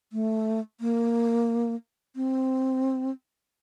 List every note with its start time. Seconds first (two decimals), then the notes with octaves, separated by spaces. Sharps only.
0.13 A3
0.81 A#3
2.16 C4